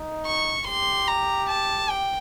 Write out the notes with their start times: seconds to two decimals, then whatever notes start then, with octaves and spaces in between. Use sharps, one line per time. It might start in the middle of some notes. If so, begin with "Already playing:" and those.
Already playing: D#4
0.26 C#6
0.67 G4 C6
1.08 A#5
1.50 A5
1.90 G5